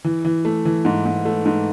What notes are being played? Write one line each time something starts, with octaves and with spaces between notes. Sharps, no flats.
E3
E3
A3
E3
G#2
G#2
A3
G#2